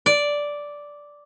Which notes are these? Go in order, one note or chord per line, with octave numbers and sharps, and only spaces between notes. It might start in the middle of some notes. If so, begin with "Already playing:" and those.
D5